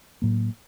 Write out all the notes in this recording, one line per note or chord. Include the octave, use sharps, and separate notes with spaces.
A2 F#3 A#3